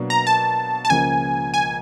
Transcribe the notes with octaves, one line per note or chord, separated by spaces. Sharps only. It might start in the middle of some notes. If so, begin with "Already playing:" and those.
Already playing: B2 F#3 A#3 D4
A#5
A5
A5
C#2 C#3 F3 A#3 G#5
G#5